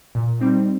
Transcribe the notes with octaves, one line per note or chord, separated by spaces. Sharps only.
A#2
G3 C4 D#4